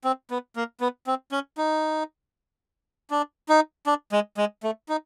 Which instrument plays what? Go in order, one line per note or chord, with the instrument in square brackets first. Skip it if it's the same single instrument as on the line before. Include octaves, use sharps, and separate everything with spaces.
[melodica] C4
B3
A#3
B3
C4
C#4
D#4
D4
D#4
D4
G#3
G#3
A3
D#4